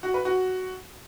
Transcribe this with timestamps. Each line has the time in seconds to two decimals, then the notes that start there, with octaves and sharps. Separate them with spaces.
0.03 F#4
0.14 B4
0.25 F#4